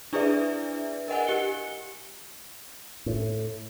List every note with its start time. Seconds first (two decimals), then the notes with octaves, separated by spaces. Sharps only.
0.13 D4 E4 G#4 B4 D5 E5
1.08 A#4 D#5 F#5 G#5
1.27 G4 C#7 G7
3.06 A2